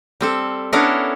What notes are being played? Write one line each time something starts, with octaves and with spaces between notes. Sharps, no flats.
G3 C4 A4
B3 C#4 D4 E4 A4 A#4